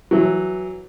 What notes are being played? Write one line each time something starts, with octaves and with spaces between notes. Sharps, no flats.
E3 F#3